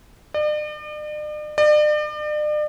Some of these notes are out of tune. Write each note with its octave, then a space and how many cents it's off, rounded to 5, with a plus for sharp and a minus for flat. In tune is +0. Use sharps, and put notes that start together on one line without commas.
D5 +45
D5 +40